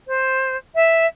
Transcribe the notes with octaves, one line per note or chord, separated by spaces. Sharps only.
C5
E5